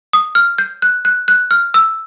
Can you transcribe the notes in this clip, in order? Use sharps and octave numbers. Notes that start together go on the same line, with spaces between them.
D#6
F6
G6
F#6
F#6
F#6
F6
E6